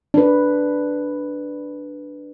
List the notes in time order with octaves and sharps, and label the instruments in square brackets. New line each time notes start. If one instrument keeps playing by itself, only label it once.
[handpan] D4 B4